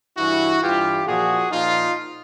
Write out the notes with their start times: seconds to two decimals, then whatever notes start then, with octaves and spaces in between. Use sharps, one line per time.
0.17 G2 E3 E4 F#4
0.63 G2 E3 F4 G4
1.07 A#2 F3 F#4 G#4
1.52 A#2 F3 D#4 F4